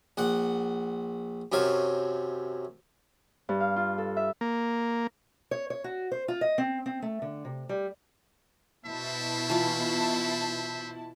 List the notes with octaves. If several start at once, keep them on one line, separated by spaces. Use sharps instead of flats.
A#1 F#5
F#2 C3 C#5 F5
G2
F5
F4
A4
E5
A#3
C#5
C#5
F#4
C5
F4
D#5
C4
C4
A3
D3
C3
G3
B2 E4 C5 E5 A5
E3 F4